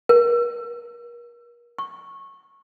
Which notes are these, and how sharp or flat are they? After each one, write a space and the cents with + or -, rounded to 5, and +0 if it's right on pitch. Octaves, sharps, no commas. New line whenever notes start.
A#4 +35
C#6 -20